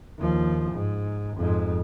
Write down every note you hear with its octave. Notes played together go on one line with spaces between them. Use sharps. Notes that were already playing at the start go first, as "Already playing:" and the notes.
D#2 F3
G#2
F2 G#2